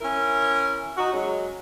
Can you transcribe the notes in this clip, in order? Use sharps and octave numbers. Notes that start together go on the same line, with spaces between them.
C#4 E4 A#4
D#4 F#4
F#3 G#3 C#4